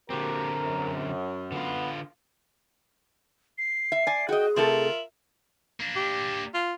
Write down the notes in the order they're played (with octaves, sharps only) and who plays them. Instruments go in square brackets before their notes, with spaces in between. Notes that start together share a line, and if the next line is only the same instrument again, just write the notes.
[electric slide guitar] D3 C4 [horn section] A#3 F#4 G4 [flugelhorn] A#4
[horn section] F#2
[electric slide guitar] D3 F4 [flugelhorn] B3
[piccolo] C7
[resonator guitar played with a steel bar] E5
D5 G#5
[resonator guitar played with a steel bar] F#4 D#5 [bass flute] G#4 [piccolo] G5
[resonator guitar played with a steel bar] C3 A3 A4 [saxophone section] F4 A#4 E5 [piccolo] F#7
[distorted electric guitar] A#3 D4
[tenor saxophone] G4
F4